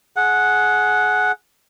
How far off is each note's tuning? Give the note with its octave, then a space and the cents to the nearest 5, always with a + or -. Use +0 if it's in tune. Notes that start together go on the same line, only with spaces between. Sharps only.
G#4 +20 F#5 -5